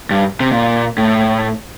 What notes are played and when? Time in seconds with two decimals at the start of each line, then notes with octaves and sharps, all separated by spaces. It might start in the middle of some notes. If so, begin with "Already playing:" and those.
0.11 G2
0.40 C3
0.52 A#2
0.98 A2